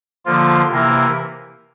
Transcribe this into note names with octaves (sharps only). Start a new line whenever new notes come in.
D3 F3 A#3 F4
C3 E3 A#3 E4 A#4